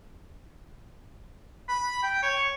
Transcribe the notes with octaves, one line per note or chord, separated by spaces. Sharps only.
B5
G5
C#5